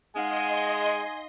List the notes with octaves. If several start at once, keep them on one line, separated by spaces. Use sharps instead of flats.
G#3 D#4 D#5 F5 F#5 G#5 C6